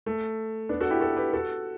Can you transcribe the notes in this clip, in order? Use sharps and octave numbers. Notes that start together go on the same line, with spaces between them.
A3
B3 D4
F#4 A4
E4 G4
F#4 A4
G4 B4
F#4 A4